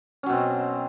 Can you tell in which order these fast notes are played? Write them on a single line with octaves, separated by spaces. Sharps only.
C#4 F#3 B2 C4